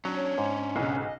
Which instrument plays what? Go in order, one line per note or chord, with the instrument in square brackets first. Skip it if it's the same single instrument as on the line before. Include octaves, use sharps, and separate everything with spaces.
[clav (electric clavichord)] F#3 [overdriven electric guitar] C#4 D4
[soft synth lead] C#5
[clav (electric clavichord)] G#2
[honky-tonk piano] B1 C#3 [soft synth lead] D#5